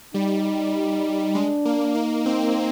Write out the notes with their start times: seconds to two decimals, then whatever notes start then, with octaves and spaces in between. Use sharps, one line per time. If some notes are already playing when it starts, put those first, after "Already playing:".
0.14 G3 D#4
1.35 G#3 D4
1.65 A#3
1.95 A#3 D#4
2.26 C4